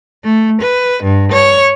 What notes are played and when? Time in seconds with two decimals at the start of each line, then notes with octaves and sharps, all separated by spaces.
0.24 A3
0.61 B4
1.03 G2
1.32 C#5